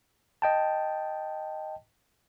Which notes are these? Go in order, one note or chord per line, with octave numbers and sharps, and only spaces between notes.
D#5 G5 A5